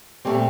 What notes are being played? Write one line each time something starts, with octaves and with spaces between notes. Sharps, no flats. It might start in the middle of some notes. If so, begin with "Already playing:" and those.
A#2 G3 A3 C4 G4